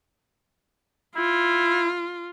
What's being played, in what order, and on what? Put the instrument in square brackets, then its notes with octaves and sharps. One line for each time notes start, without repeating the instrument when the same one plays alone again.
[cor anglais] E4 [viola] F4